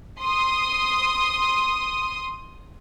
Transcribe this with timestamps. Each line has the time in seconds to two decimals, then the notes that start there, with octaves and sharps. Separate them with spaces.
0.20 C6 D#6